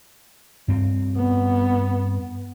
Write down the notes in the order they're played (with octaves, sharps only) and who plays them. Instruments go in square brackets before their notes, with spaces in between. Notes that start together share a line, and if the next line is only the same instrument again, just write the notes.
[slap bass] G2 C4
[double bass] B3